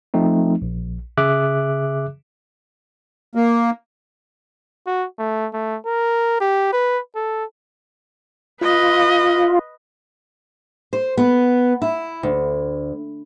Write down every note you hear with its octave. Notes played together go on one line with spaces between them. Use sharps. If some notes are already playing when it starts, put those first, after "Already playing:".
F3 A3 C4 D#4
A#1
C#3 G#4 E5 D6 F#6
A#3
F#4
A3
A3
A#4
G4
B4
A4
F4 B4 D#5
C5
B3
E4
D2